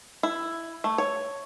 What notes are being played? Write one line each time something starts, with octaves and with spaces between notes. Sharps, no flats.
E4
A3
C#5